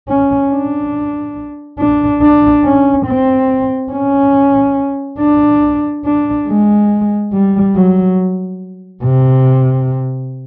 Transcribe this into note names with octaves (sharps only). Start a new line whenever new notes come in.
C#4
D4
D4
D4
C#4
C4
C#4
D4
D4
G#3
G3
F#3
C3